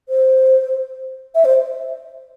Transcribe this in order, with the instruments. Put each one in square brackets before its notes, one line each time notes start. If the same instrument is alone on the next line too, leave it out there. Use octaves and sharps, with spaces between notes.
[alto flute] C5
E5
C5